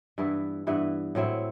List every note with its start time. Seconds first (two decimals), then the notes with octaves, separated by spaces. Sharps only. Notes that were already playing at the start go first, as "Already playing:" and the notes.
0.18 G2 E3 B3 E4
0.67 G2 E3 B3 E4
1.15 A2 F#3 C4 E4